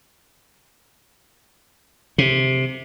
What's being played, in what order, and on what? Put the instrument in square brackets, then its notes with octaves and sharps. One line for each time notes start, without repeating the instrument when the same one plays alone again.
[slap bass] C3